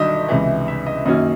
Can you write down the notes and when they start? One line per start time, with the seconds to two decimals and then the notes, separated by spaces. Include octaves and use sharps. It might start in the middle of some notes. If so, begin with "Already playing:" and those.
Already playing: G1 G2 D#3 F#3 D#5 E5
0.29 C#2 C3 E3
0.68 E5
0.87 D#5
1.06 F#2 D#3 F#3 A#3 C#4 D#5